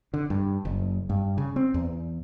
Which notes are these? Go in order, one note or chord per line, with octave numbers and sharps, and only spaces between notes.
D3
G2
F#1
G2
C#3
C4
E2